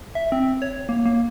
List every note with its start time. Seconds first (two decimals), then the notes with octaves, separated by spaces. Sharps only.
0.15 E5
0.32 C4
0.62 C#5
0.89 A#3
1.05 A#3